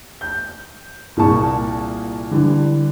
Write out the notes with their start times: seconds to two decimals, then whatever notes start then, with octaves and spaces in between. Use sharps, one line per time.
0.21 G6
1.17 C2 A#2 A#3 G#4 A5 C#6
2.31 D3 E3 G3 D4